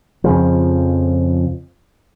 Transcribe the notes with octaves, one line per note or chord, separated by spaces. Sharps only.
F2 C#3 F3